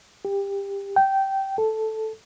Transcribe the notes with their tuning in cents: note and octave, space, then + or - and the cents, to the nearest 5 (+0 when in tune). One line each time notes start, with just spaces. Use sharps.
G4 +20
G5 -15
A4 -5